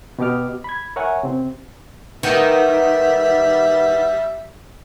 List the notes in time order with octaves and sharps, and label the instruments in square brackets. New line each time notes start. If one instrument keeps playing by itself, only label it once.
[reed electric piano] B2 B3 G4 D#5 D6 F6
B5 G#6
A#4 C#5 E5 F#5 G#5
C3 C4
[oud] D#3 [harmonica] G3 E5 [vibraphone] B4 F#5